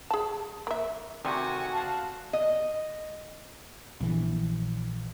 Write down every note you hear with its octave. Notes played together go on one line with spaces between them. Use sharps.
G#4 A5
A#3 E5
D2 C3 D#3 F#4 G#5 C#6
F5 A5 F#6
D#5
A#1 E3